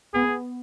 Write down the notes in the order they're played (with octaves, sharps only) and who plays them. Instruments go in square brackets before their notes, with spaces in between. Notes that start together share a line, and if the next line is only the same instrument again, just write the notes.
[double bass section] B3 [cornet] G#4